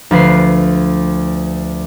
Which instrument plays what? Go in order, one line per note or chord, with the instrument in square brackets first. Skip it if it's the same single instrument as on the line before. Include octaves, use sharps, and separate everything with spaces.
[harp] D2 F3 B4 C7